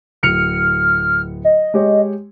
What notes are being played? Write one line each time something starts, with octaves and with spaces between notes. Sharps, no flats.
D1 F6 C#7 F7
D#5
G#3 G4 C#5